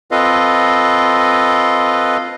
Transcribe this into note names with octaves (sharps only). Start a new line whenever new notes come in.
C4 F4 A4 B4 D#5 F5